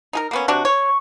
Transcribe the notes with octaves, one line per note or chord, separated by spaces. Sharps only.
D#4 G#4 A#4
A#3 B3 C#4
C3 D4 F#4
C#5 C#6